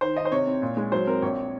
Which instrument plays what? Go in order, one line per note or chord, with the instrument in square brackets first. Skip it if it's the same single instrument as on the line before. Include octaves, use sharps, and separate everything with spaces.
[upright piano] D#3 C5
D#3 D#5
C5
C3 C#5
C4
A#2
G#3
F#3 C5
C4 A#4
A#1 C#5